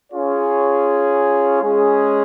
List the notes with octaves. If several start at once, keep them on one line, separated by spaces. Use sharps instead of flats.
C#4 F4 G#4 C#5
G#3 C#4 G#4